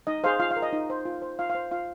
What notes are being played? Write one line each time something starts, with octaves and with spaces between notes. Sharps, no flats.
D#4 D#5
G#4 C5 F5
F4 F5
F5
A#4
D#5
D#4
C5
F4
C5
F4 F5
F5
C5
F4 F5